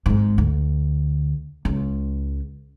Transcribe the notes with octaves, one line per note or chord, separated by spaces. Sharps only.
G#1 G#2
D2
C#2